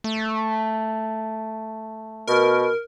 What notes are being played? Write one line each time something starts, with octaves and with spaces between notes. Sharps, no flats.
A3
B2 A#4